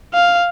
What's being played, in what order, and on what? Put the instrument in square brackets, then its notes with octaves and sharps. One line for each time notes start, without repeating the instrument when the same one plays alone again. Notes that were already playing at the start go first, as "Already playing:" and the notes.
[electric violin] F5